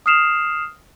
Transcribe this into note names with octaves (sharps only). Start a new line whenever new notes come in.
D#6 F6 C7 E7 F7